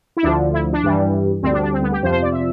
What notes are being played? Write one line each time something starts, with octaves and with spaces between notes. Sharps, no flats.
E4
D2 D3 F3 D4
E4
D4
G2 E3 G3
D2 D3 G3 C4
D4
D4
C4
B3
G4
F2 C3 F3 C5
C5
D5
E5